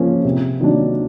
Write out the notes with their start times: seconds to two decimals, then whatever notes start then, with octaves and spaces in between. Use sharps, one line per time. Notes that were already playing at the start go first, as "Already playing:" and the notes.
Already playing: C#3 F3 A#3 C#4
0.25 C3
0.61 D#3 F#3 A#3 D4